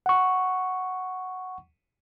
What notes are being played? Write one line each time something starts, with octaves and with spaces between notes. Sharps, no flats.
F#5 C#6